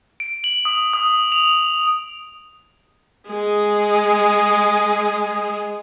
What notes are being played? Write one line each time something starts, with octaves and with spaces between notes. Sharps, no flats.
D7
F#7
D#6
D#6
F7
G#3 G#4